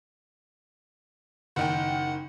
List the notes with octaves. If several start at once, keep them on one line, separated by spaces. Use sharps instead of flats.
F#1 D#3 F#5 G5